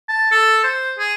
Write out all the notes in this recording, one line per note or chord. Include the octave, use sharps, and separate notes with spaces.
A5
A4
C5
G#4